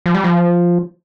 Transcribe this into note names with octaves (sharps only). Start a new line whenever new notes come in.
F3
G3
F3